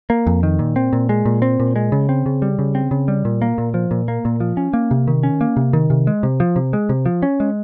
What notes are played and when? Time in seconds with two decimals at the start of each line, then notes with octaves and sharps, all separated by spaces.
0.10 A#3
0.27 F2
0.43 D#3
0.59 A#2
0.76 C4
0.93 A#2
1.09 G#3
1.26 A#2
1.42 C4
1.60 A#2
1.76 G#3
1.92 C#3
2.09 C4
2.26 C#3
2.42 G3
2.59 C#3
2.75 C4
2.91 C#3
3.08 G3
3.25 A#2
3.42 A#3
3.58 A#2
3.74 F3
3.91 A#2
4.08 A#3
4.25 A#2
4.40 F3
4.57 C#4
4.73 A#3
4.91 C3
5.08 D#3
5.23 C#4
5.41 A#3
5.57 C3
5.73 D#3
5.90 C3
6.07 G#3
6.23 C3
6.40 F3
6.56 C3
6.73 G#3
6.89 C3
7.06 F3
7.23 C#4
7.40 G#3